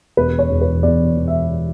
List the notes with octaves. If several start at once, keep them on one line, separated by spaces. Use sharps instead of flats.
E1 B4
C#5
E2
B4
E2 D5
E1
E5